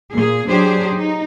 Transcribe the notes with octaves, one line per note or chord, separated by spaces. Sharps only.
A#2 A#3 G#4
F#3 D4 G4 G#4 C5
D#4